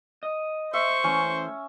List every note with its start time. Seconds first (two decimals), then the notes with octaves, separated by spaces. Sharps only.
0.23 D#5
0.74 C5 E5 C#6
1.04 E3 A3 C#4